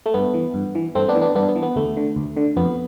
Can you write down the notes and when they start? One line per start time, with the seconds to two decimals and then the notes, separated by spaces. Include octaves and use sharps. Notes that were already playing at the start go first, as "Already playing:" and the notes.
0.06 A3
0.14 G2 B3
0.34 E3
0.54 G2
0.75 E3
0.95 G2 A3 C4
1.08 B3 D4
1.15 E3
1.21 B3 D4
1.35 G2 B3 D4
1.48 B3
1.56 E3
1.63 B3
1.76 D2 A3
1.97 D3
2.16 D2
2.37 D3
2.57 F2 B3